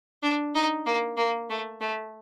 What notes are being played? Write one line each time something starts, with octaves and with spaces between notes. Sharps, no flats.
D4
D#4
A#3
A#3
A3
A3